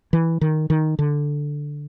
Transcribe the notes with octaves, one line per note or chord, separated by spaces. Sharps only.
E3
D#3
D#3
D3